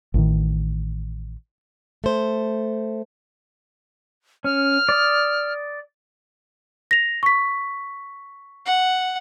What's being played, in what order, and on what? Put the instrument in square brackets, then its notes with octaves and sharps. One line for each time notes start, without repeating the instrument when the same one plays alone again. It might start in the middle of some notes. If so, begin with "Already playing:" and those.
[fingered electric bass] A1 A2 D#3
[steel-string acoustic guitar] A3 C5
[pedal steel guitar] C#4 [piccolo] F6
[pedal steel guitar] D5 D#6
[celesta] A#6 F7
C#6 B6
[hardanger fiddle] F#5